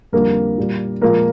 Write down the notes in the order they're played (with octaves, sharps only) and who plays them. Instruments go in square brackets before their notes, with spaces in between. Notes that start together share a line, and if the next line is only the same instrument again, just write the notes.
[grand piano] F2 D3 G3 A#3 A#4
A#2 G3
A#2 F3 G#3 A#3 A#4